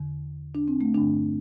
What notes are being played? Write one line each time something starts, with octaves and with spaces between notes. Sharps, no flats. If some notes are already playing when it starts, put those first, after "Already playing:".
Already playing: E2 D3
D4
C4
A3
G2 D3 D4